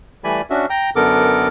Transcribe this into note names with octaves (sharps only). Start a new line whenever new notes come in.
E3 G3 A3 D5 G#5 B5
C#4 D4 F#4 E5
G5 A#5
F#2 D3 B3 A4 A#4 D6